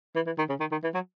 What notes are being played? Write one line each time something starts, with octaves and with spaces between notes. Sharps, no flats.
E3
E3
D#3
C#3
D#3
D#3
E3
F#3